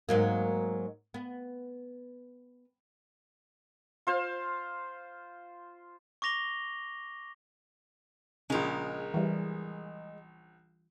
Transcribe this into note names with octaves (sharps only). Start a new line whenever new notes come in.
G#2 F#3 A#3
B3
F4 C5 F5
C#6 D6 A#6 F7 G7
A#1 C#3 G#3 A#4
E3 G3